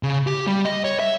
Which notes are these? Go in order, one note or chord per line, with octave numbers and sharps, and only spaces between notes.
C#3
G4
G3
D#5
C#5
E5